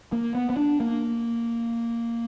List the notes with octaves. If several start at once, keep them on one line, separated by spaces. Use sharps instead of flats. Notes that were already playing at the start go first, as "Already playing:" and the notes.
A#3
B3
B3
D4
A#3